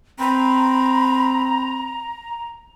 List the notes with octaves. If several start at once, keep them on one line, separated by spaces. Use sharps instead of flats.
C4 A#5 B5